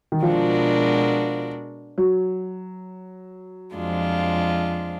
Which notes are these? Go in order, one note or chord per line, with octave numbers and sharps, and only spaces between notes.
D#3
B2 F3 G#3 D4 F#4 A#4
F#3
F2 F3 G#3 D4 F4